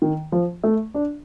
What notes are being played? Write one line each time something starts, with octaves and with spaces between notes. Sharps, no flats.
D#3
F3
A3
D4